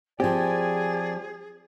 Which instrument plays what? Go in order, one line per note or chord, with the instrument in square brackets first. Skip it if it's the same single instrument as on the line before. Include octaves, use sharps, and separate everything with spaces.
[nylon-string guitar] F3 C4 [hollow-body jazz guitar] G4 [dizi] G#4 [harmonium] D5 G#5